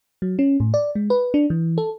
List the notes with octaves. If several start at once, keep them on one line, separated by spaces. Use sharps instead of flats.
F#3
C#4
A2
D5
G#3
B4
D4
E3
A4